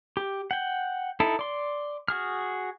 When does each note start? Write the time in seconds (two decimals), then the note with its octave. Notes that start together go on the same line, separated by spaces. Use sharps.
0.17 G4
0.51 F#5 G5
1.20 D#4 E4 A4
1.39 D5 C6
2.08 F#4 G#4 F6